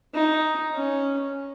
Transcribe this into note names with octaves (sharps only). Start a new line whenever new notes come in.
D#4
C#4